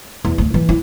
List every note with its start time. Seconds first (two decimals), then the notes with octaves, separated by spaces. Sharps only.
0.25 E2
0.38 D2
0.54 E3
0.69 E4